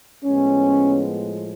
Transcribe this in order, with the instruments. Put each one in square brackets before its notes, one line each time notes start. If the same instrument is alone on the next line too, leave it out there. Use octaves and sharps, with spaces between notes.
[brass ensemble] A2 F3 G#3 B3 C#4